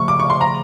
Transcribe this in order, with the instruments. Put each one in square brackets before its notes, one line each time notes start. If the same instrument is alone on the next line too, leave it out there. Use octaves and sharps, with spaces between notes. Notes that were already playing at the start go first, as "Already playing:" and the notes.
Already playing: [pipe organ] C#3 F3 A3 [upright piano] C#6
[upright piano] D6
C#6
C6
A#5